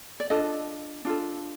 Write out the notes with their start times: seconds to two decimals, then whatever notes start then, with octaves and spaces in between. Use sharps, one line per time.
0.20 D5
0.30 D4 F4 A4 D#5
1.05 D4 F4 A4